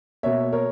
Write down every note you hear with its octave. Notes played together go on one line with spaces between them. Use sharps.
B2 A#3 C#5 E5
A#4 C#5